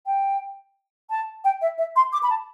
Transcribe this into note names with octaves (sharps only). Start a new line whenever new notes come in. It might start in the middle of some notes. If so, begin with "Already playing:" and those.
G5
A5
G5
E5
E5
C6
D6
B5
A5